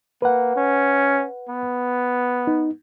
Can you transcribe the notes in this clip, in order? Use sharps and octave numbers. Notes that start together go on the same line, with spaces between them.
A#3 B4 F#5
C#4
B3
D#4